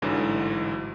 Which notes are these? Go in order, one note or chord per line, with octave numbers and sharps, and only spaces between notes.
A1 G#2 D3 E3 F#3